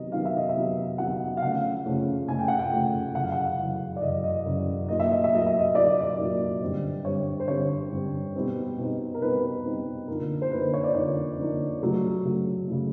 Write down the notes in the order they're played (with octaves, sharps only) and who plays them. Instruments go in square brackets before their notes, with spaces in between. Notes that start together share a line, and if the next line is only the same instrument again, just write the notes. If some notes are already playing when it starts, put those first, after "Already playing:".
Already playing: [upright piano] C3 D#3 F#3 B3 D#4 D#5
C3 D#3 F#3 B3 D#4 F5
E5
D#5
E5
C3 D#3 F#3 B3 D#4
C3 D#3 F#3 B3 D#4 F#5
F5
C#3 F3 A3 C#4 F#5
C#3 F3 A3 C#4
C#3 F3 A3 C#4 G#5
G5
F#5
G5
C#3 F3 A3 C#4
F#2 C#3 E3 F#5
F5
F#5
F#2 C#3 E3
D5
F#2 C#3 E3 D#5
D#5
F#2 C#3 E3
A#2 F#3 A#3 D#4 D#5
E5
D#5
E5
A#2 F#3 A#3 D#4 D#5
E5
D#5
A#2 F#3 A#3 D#4 D5
D#5
D5
A#2 F#3 A#3 D#4
G2 D3 G3 C4
G2 D3 G3 C4 C#5
C5
G2 D3 G3 C4 C#5
G2 D3 G3 C4
B2 G3 C4 D#4
B2 G3 C4 D#4
A#4
B2 G3 C4 D#4 B4
B2 G3 C4 D#4
D3 F3 A#3 D#4 A#4
C5
D3 F3 A#3 D#4 B4
C5
C#5
D5
D3 F3 A#3 D#4 C#5
D3 F3 A#3 D#4
C#3 F#3 A3
C#3 F#3 A3
C#3 F#3 A3